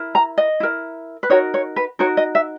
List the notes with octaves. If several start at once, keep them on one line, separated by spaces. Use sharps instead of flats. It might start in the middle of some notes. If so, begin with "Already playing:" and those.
Already playing: E4 A#4
A#5
D#5
E4 A#4
B4
D#4 F#4 A#4 C#5
C#5
B4
D#4 F#4 A#4 C#5
D#5
E5